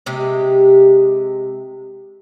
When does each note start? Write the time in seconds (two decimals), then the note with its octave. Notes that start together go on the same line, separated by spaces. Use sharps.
0.06 C3 G#3 G4